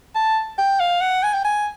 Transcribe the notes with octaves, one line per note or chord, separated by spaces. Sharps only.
A5
G5
F5
F#5
G#5
G5
G#5